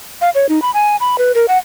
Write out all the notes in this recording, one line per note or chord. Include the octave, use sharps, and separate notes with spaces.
F5
C#5
D#4
B5
G#5
B5
B4
A#4
F#5